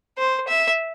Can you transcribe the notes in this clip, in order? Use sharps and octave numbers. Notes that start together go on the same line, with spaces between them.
C5
E5